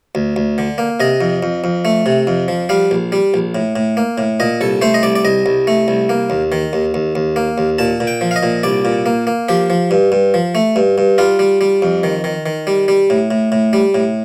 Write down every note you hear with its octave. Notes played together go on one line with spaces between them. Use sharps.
D2
D2
D3
A#3
C3 D#5
F2
F2
F2
A3
C3
F2
F3
G3 F5
A#1
G3
A#1
A2
A2
A#3
A2
A#2 D#5
C2 A4
A3 C5
D#5
C2 D5
D5
C2 D#5
C2
A3
C2
A#3
D#2
D#3
D#2
D#2
D#2
A#3
D#2
A#2 A5
A#2
G5
F3
F5
D#5
A#2
C2 D5
A#2
A#3
A#3
F3 G4
F3
G2
G2
F3
A3
G2
G2
G3 F4
G3
G3
F2
D#3
D#3
D#3
G3
G3
A2
A2
A2
G3
A2